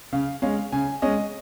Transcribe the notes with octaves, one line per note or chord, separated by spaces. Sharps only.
C#3 F5
G#3 C#4 F5
C#3 G#5
G#3 C#4 D#5